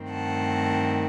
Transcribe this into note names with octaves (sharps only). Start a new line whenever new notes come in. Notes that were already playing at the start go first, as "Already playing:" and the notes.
Already playing: G2 D#3 A3 C4
F#5 A5